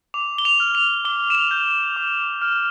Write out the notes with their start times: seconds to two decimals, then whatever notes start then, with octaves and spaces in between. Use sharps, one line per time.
0.14 D6 F7
0.38 G7
0.45 F7
0.60 F6
0.75 F7
1.05 D6 G7
1.30 E7
1.35 F7
1.51 G6
1.96 D6
2.42 F6